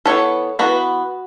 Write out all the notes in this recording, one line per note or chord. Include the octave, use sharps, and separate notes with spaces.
E3 B3 A4 C#5
E3 B3 F#4 B4